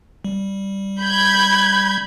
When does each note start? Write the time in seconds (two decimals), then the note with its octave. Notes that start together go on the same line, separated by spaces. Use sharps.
0.24 G3
1.01 B5 G6 G#6